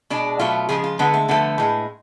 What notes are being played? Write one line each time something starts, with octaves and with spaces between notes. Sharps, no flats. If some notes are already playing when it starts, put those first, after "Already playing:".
B2 G#3 D4
B2 F#3 A3 F4
C#3 F3 G#3 G#4
F4
D3 G#3 B3
A3
D3 F3 A3 B3
A2 G#3